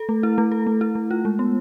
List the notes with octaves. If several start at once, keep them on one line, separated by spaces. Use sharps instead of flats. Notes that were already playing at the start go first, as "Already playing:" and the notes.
Already playing: A4
A3
E4
A3
A4
A3
E4
A3
F4
G#3
B3